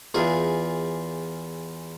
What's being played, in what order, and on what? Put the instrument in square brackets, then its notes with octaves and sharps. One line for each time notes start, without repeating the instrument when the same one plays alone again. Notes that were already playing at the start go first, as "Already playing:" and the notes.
[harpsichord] E2 F4 G#4